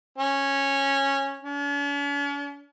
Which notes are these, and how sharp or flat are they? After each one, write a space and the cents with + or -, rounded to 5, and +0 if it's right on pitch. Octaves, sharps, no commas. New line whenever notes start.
C#4 -10
C#4 +45